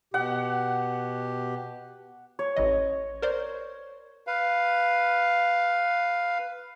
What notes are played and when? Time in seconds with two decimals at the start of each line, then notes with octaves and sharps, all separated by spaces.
0.14 B2 G4 F#5
2.39 C#5
2.57 A1 E3 D#5
3.22 A#4 C5 D5
4.27 B4 F5